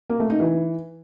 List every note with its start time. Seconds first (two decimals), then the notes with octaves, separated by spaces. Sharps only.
0.10 A#3
0.20 A3
0.30 D#4
0.40 E3